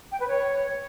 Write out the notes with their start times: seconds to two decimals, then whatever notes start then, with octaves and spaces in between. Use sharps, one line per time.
0.12 G5
0.20 B4
0.28 C#5